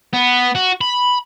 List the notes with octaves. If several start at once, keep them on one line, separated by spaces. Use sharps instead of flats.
B3
F#4
B5